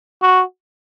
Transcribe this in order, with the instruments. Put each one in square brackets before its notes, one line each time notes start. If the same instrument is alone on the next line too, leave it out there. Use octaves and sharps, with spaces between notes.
[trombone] F#4